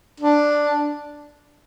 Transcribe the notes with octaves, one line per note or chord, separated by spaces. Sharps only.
D4